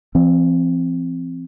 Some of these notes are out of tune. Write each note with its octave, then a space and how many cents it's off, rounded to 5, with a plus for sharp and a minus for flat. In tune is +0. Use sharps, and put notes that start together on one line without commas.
E3 +45 C4 +0